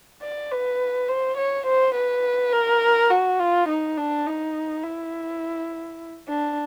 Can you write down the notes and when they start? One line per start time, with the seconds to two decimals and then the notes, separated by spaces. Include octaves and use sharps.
0.23 D5
0.51 B4
1.09 C5
1.38 C#5
1.66 C5
1.95 B4
2.53 A#4
3.11 F#4
3.40 F4
3.69 D#4
3.98 D4
4.27 D#4
4.84 E4
6.28 D4